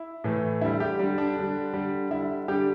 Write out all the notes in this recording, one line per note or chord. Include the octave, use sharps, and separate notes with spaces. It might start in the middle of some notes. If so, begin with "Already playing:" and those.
Already playing: E4
A2 E3 A3
D3 G3 E4
G4
D3 G3
D4
D3 G3
D3 G3
D3 G3 E4
D3 G3 G4